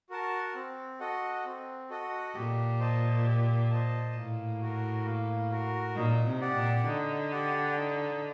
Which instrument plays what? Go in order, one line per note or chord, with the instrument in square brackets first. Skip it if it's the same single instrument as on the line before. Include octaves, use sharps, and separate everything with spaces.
[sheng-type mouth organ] F#4 A#4 F#5 A5
C4
F#4 A4 D#5 F#5
C4
F#4 A4 D#5 F#5
[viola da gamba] A#2 [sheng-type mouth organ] G4
[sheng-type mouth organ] C5 D#5 A5
G4
C5 D#5 A5
[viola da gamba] A2 [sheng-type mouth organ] A#3
[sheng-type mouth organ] F#4 A#4
A#3
F#4 A#4
[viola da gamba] A#2 [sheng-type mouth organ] D#4
[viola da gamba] C3
[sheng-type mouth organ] G4 D5 F#5
[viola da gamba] A#2
[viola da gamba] D3 [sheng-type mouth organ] D#4
[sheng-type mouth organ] G4 D5 F#5
D#4